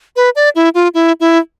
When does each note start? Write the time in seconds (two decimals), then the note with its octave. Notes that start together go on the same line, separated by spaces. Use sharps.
0.16 B4
0.36 D5
0.55 E4
0.75 F4
0.94 E4
1.20 E4